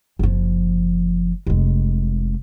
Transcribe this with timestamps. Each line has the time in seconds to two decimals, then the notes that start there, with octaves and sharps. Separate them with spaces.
0.19 F#1 F3
1.47 F1 G#3